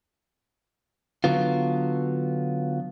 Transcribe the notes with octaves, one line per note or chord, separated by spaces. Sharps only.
D3 F#3 B3 F4